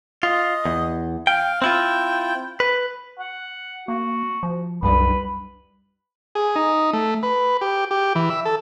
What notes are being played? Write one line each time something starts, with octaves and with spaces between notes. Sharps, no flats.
F4 D#5
E2
F5 G5
C4 E4 F4 G5
B4
F#5
A#3 F#4
F3
C2 F#2 G3 B4
G#4
D#4
A3
B4
G4
G4
E3
E5
A4